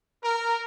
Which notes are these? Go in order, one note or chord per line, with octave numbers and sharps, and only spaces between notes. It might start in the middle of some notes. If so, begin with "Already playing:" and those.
A#4